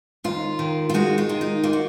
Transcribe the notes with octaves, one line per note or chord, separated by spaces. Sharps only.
D#2 F4
D#3
F4
G#3 D#4 F#4
F4
D#3
D#4
A#3 F4
F#4